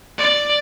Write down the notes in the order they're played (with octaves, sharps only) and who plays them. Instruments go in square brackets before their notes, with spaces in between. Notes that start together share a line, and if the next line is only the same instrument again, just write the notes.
[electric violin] D5